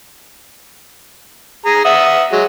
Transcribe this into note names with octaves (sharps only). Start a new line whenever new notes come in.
G#4 A#5
E5 F#5 D#6
F#3 G#3